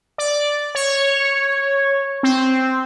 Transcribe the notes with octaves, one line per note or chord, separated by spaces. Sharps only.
D5
C#5
C4